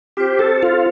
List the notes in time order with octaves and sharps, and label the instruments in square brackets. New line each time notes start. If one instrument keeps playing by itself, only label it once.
[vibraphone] C4 F4 C5 [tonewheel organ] G4
[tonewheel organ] A4
F4